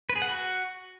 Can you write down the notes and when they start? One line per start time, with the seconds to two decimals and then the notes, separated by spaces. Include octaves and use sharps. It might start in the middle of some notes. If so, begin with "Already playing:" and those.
0.09 B4
0.16 G#4
0.22 F#5
0.28 F#4